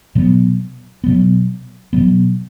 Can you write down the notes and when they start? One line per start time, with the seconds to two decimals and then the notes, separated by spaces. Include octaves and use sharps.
0.15 B2 F#3 B3
1.04 B2 F#3 B3
1.93 B2 F#3 B3